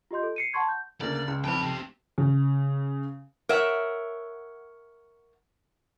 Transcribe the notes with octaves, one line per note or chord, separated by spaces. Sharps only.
F4 G4 D#5 C6 G6
A4
C7 C#7 D#7
F#5 A5 C6 C#6 G#6
G6
D2 C#3 A#3 D5
C#2 C#3
B1 F2 G5 B5
C4 G4
C#3
A#4 C#5 E5 F#5